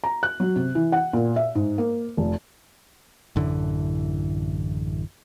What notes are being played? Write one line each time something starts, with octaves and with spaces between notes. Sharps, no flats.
A#5
F#6
F#3
C3
E3
F#5
A#2
E5
G#2
A#3
F1
A1 F#2 D3 E3